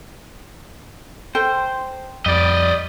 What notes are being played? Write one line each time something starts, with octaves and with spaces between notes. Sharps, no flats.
A4 C5 G5
F2 G3 D5 D#5